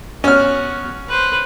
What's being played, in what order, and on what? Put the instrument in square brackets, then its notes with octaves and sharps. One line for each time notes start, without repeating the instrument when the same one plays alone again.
[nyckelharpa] B3 F#4 [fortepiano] C#4 F6
[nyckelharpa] B4 C5